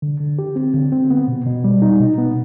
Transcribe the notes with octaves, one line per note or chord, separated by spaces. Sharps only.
D3
D3
G4
C4
D3
C4
B3
B2
B2
G3
D#4
B2
B3